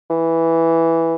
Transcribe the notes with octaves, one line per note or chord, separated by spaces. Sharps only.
E3